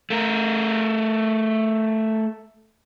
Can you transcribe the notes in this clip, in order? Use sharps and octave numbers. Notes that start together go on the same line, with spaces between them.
A3 A#4